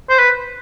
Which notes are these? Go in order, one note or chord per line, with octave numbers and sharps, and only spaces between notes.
C5
B4